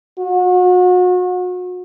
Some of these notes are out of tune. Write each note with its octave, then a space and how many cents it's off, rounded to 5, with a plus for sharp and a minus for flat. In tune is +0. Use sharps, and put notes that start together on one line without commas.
F#4 -35